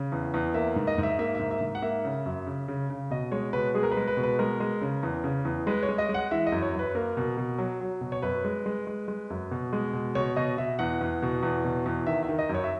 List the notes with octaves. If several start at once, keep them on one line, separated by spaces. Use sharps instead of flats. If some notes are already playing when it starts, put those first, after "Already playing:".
Already playing: C#3
E2
E2
A#3 E5
G#2
D#5
G#2
E5
A#3 E5
G#2 E5
E5
G#2
F#5
A#3 E5
C#3
F#2
C#3
C#3
C#3
B2 D#5
G#3 C#5
B2 B4
G#3 G#4
A#4
B4
G#3
B4
B2
B4
G#3 A#4
G#3
C#3
E2
C#3
E2
G#3 B4
C#5
G#3
D#5
G#3
F#5
E3 E5
D#5
F#2
C#5
F#2
B4
A#3 A#4
B2
B2
F#3
F#3
B2
C#5
F#2 B4
G#3
G#3
G#3
G#3
F#2
B2
G#3
B2
B2 C#5
B2 D#5
B2 E5
E2 F#5
E2
B2
E2
B2
E2
D#3 E5
E5
D#3
D#5
F#2
C#5
E5